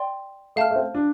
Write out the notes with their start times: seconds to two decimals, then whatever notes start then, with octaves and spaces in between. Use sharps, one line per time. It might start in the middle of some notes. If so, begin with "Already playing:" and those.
Already playing: D5 G5 C6
0.56 A3 F5 A5 F6
0.71 A3
0.76 C4
0.95 D4